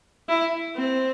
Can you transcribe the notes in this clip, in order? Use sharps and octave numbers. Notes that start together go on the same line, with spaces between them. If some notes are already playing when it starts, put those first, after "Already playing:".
E4
C4